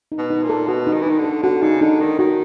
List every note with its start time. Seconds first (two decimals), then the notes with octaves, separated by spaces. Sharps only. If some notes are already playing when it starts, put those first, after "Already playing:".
0.12 D#4
0.18 B2
0.30 D#4
0.43 A#2
0.49 A4
0.68 B2 F#4
0.87 D#4
0.93 D#3
1.01 E3
1.06 D#3 D#4
1.18 D3
1.24 A4
1.43 D3 F#4
1.62 C#3 D#4
1.81 D3 D#4
2.00 D#3 A4
2.19 D#3 F#4